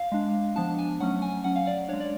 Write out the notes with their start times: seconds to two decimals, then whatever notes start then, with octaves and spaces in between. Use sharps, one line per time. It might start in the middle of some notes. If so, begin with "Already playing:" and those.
Already playing: F5
0.12 G#3 D4
0.56 F3 B3 D4 A5
0.78 G#5
1.00 F#3 A3 C#4 F#5
1.22 G#5
1.44 F#3 C#4 F#5
1.56 F5
1.67 D5
1.89 D4 C#5
1.93 G#3
2.00 D5